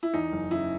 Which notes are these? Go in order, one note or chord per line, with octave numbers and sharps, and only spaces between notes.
E4
E2 D#4
F#1
C#3 E4